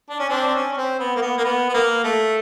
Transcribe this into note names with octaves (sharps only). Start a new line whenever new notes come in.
D4
C#4
C4 D4
C4
C#4
C#4
C4
B3
A#3
B3
A#3
B3
B3
A#3
A3